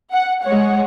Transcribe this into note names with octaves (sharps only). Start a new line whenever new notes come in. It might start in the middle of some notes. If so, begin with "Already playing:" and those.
F#5
G#3 C#5 F#5